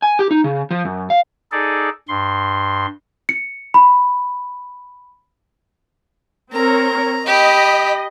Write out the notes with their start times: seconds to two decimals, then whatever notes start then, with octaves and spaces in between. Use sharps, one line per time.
0.02 G#5
0.19 G4
0.31 D#4
0.44 C#3
0.71 F3
0.85 F#2
1.10 F5
1.52 D#4 G#4 A4 D5
2.08 G2 C6
3.29 C#7
3.74 B5
6.53 C4 A#4 C#5 A#5
7.26 G4 D#5 B5